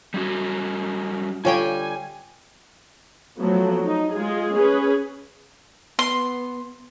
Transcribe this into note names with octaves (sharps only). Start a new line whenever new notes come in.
G3 C#4 F#4
D3 G3 F4 C#5 G5 G#5
F3 F#3 A3 B3
D#4
G#3 F4 G#4
C#4 G#4 B4
B3 C6